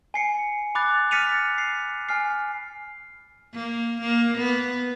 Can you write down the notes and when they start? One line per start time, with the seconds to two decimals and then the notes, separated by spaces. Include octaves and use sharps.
0.14 G#5 C7 C#7
0.75 B5 D6 F#6 A6
1.11 F6 A6 B6 C#7 D#7 F7
1.58 C7
2.09 G#5 F6 C7
3.53 A#3
4.01 A#3
4.38 B3